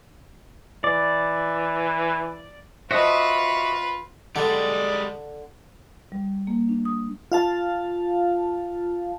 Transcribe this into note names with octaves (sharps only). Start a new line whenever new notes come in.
E3 D5
F4 F#4 B4 C5 D#5 E5 A5 D#6
D3 G3 G#3 D5
G3
A#3
D4
D#6
F4 F5 A5